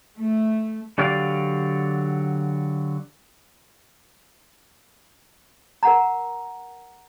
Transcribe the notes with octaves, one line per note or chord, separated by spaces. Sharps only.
A3
D3 F#3 G4 D5 F5
A#4 F#5 A#5